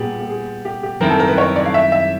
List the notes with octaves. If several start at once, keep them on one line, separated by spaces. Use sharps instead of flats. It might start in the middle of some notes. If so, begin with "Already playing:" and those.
Already playing: A#2 G3 B3 G4 G#4
G4
G#4
G4
G4
F#2 D#3 G3 C4 E4 A#4
A4
A#4
B4
C#5
D5
F5
E5
E5